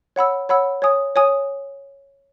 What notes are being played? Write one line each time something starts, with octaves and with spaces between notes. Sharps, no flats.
C#5 F#5 B5 E6
C#5 F#5 B5 E6
C#5 G#5 D#6
C#5 G#5 D#6